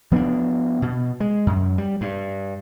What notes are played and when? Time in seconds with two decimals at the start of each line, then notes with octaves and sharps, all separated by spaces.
0.11 F3 B3 C4 D4
0.82 B2
1.20 G#3
1.47 F#2
1.78 G3
2.01 G2